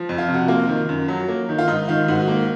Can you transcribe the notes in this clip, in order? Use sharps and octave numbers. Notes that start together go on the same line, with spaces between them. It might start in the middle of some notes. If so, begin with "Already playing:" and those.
Already playing: F3
F2
F4
C3
F#4
A#3 F4
D#3
F#2
F#3
A#3
D#3
F4
G#2 D#4
D#3 F4
G#2 F#4
A#3